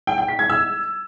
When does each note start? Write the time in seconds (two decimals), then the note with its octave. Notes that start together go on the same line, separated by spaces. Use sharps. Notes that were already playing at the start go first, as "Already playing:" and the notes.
0.07 G5
0.18 G5
0.28 B6
0.39 G#6
0.49 E6